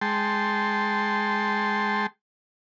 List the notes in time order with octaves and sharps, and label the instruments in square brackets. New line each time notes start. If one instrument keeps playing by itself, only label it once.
[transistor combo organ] G#3 G5 A5 C6